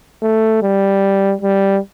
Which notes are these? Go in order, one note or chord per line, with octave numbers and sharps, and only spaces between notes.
A3
G3
G3